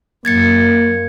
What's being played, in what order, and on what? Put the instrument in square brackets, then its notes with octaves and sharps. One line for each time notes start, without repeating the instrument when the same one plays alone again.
[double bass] F#2 [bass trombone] A#3 [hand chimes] G#6 A6 C#7